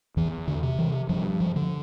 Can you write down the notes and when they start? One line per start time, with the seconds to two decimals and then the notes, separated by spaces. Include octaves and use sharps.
0.17 E2 E3
0.48 D3
0.63 C3
0.79 E3
1.09 G2 F3
1.40 F3
1.56 D3